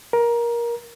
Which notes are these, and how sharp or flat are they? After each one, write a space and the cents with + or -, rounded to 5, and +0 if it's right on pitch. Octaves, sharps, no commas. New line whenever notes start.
A#4 +20